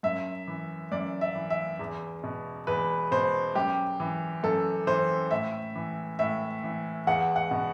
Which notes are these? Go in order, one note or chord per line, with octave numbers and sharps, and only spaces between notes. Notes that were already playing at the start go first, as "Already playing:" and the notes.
F#2 E5
E3
F#2 D5
E5
E3
E5
E2
B2
E2 B4
B2 C5
F#2 G4
E3
F#2 A4
E3 C5
A2 E5
E3
A2 E5
E3
E2 F#5
F#5
B2